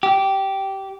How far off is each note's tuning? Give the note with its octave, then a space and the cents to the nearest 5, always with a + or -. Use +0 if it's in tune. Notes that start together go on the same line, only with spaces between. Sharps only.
G4 -15